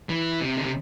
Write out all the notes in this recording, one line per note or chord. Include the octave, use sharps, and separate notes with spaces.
E3
C3
D3
C3